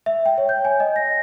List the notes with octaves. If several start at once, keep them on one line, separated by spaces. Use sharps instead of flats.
E5
G5
C#5
G6
G#5
D#5
A#6